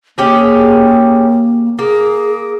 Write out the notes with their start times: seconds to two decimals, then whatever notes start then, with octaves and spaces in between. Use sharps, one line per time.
0.18 A#3 C#4 G4 G#4
1.79 A#3 G#4